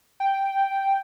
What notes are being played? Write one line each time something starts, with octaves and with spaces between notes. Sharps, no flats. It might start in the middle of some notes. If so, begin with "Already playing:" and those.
G5